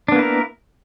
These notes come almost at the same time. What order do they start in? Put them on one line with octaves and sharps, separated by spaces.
D4 B3 A#3 E4 A#4